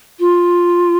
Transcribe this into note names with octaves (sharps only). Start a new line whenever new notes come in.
F4